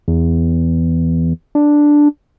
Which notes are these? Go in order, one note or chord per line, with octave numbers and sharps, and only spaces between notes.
E2
D4